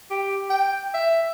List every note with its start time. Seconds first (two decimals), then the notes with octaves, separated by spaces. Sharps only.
0.10 G4
0.50 G5
0.94 E5